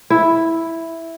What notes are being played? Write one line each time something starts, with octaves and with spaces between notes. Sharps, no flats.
E4